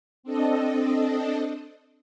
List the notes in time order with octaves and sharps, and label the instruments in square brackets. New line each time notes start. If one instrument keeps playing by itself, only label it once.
[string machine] C4 D4 A4 D#5